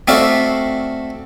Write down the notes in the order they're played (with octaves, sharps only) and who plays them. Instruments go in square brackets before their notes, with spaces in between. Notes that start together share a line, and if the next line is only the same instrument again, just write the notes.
[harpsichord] A3 C4 F#4 D5 E5 F5